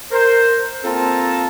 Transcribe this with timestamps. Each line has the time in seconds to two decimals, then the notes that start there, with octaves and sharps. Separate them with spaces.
0.11 A#4 C5
0.84 A#3 C4 F4 A4 A5 A#5